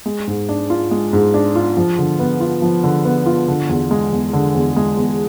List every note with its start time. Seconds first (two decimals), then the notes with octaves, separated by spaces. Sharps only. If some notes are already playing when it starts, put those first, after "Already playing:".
0.06 G#3
0.27 G#2
0.49 D4
0.70 F4
0.91 G#3
1.13 G#2
1.34 D4
1.55 F4
1.77 F3
1.99 D3
2.19 B3
2.41 F4
2.62 F3
2.84 D3
3.05 B3
3.26 F4
3.48 D3
3.69 E2
3.91 G#3
4.12 E2
4.33 D3
4.55 E2
4.76 G#3
4.97 E2